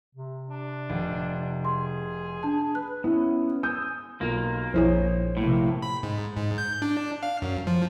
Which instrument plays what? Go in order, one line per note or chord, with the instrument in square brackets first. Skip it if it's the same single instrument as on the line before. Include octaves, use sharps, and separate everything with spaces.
[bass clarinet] C3
[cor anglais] D4
[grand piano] F1
[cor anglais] G#4 [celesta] C6
[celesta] D4 A5
[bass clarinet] B4 [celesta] F#6
[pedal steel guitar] B3 C#4 [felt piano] E4
[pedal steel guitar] G#5 D#6 E6 [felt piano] G6
[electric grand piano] B1 F4 [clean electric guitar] A#3
[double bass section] A#1 [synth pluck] F2 E4 G#4 [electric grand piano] C5 C#5
[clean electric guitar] A2 [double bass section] C3 F3 A#3
[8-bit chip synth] B5
G#2
G#2
G6
D4
F5
F#2
F3